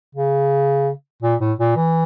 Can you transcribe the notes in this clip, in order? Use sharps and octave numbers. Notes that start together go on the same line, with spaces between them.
C#3
A#2
A2
A#2
E3